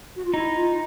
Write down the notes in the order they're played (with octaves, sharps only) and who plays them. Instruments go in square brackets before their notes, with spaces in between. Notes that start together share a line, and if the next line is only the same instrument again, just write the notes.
[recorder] F#4
F4
[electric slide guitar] D#4 [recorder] E4
[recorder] F4